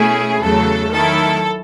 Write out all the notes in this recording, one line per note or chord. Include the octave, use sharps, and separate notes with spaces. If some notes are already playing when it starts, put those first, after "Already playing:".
Already playing: B2 A3 C#4 E4 G#4
E2 C#3 F#3 A3 A4
D#3 F#3 A3 E4 A4